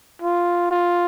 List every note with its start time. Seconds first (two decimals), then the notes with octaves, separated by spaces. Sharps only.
0.22 F4
0.71 F4